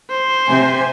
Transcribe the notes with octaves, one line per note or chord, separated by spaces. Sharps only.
C5
C3 G#5